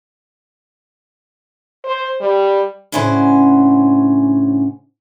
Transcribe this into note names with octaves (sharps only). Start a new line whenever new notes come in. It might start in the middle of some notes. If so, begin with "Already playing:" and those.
C5
G3
A2 C#3 C#4 D4 C5 F#5